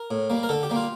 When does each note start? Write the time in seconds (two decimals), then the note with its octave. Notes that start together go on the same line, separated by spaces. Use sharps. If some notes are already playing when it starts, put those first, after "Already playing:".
Already playing: A#4
0.11 A2
0.30 G3 A#3
0.43 A#4
0.49 D3 A4
0.63 G4
0.70 G3 A#3
0.76 F4